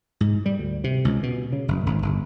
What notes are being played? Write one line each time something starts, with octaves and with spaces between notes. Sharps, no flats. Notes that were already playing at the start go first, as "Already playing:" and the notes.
G#2
G3
D2
C3
C#2
B2
C#3
F#1
G#1
G1